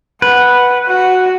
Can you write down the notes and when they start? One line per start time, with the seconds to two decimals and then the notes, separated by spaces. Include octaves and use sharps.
0.22 B4 F#5
0.87 F#4